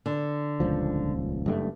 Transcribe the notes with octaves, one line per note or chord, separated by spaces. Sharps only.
D3
D#1 C#2 F3
F#1 G2 A3